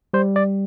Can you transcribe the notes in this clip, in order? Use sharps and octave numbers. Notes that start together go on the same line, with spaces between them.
G3 C5
D5